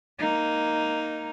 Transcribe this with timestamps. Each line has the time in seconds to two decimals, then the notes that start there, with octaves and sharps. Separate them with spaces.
0.19 A#3 D#4